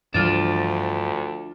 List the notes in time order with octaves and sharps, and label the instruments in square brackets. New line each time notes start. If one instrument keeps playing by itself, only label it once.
[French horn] D2 [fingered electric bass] G2 E3 G3 [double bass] F3 [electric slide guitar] D4 F4